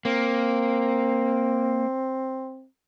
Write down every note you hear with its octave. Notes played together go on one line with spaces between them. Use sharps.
A#3 C4